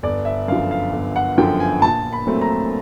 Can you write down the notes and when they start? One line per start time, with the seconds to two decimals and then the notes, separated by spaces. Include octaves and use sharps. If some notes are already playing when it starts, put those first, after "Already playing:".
0.03 G1 D5
0.25 E5
0.48 F#2 D3 F3 F5
0.71 F5
0.92 G1
1.16 F#5
1.38 F#2 D3 F3 G5
1.60 G#5
1.82 A#1 A5
2.13 B5
2.27 A#2 F#3 A3 C4
2.41 A#5